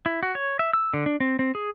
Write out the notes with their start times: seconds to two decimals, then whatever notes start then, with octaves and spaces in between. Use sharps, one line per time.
0.06 E4
0.23 F#4
0.35 C#5
0.59 E5
0.73 E6
0.94 D3
1.06 D4
1.20 C4
1.39 C4
1.55 G#4